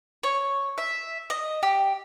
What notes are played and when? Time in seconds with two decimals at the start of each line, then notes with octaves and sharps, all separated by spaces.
0.23 C#5
0.78 E5
1.30 D#5
1.63 G4